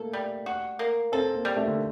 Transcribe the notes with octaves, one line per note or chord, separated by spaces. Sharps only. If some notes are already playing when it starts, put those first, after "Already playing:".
Already playing: A3 A#3 A4
G3
F#4
A#3
C4 A4
A#3
G3
A3
D3